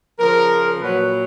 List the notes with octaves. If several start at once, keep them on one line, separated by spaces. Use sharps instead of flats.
C#3 F3 A#4
A#2 F#3 B4